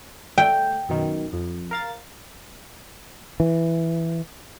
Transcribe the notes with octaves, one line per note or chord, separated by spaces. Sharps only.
A3 G5
F#2 B2 D#3
F2
A#4 F5 A6
E3